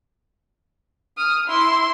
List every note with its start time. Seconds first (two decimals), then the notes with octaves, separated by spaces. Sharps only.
1.17 D#6 F6
1.47 E4 C6